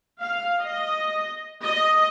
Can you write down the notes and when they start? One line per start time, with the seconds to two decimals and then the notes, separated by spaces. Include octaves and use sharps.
0.20 F5
0.61 D#5
1.64 D#5